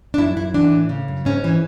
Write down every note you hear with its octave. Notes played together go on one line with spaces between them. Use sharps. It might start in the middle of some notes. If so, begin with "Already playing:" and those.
D4
F#2 E4
F#2 E4
E3 D4
A2
C#3
F#2
G#2 C#4
E3